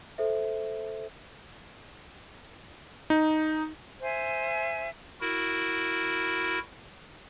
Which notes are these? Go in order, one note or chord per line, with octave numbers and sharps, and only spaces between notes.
A4 C5 E5
D#4
C5 E5 G#5
E4 F#4 A#4